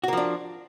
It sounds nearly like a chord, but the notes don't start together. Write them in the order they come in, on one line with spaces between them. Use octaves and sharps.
F#4 A#3 F3 D4